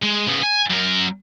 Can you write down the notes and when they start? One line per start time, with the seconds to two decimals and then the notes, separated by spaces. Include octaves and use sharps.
0.02 G#3
0.27 C#3 B3
0.42 G#5
0.70 F#2 A#4